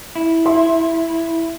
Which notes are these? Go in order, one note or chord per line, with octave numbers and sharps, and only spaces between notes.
E4
E5 C6